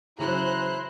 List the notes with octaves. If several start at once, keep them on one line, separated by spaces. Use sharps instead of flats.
C#3 E3 F#3 E4 C5 A#5 F#6